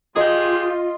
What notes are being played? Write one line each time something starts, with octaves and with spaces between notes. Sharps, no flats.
F4 G4 G#4 D#5